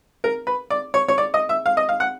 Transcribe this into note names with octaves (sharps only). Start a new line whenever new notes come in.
A#4
B4
D5
C#5
C#5
D5
D#5
E5
F5
D#5
F5
F#5